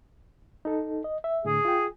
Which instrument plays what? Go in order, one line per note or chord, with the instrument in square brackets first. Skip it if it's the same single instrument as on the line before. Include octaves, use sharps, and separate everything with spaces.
[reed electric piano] D#4 A4
D#5
E5
[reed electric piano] A2 D3 [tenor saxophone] G#4
[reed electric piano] F4 G5